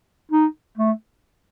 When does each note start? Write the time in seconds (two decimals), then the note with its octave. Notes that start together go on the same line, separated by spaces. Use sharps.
0.32 D#4
0.77 A3